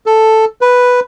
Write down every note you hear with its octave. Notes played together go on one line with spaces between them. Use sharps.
A4
B4